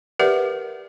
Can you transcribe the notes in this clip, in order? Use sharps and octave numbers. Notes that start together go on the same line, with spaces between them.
G4 A#4 B4 D5 E5 F#5